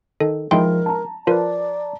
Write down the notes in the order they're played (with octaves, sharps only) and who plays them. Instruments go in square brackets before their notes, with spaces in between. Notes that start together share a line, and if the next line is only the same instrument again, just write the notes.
[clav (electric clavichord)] D#3 [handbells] A4
[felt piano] F3 [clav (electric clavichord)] G#3 D#4 E4 [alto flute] A#4 [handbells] G5 C6
[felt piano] A5 A#5
[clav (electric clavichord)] F3 B4 [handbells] F4 A#4 [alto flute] D5